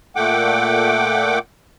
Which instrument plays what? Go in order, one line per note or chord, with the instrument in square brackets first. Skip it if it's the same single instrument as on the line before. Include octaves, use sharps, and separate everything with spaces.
[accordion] A#2 A3 F#5 G5 D6